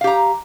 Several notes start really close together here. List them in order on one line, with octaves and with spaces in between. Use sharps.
F5 G4 A#5